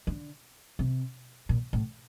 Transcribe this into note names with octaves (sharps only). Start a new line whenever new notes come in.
D3
C3
A#2
A2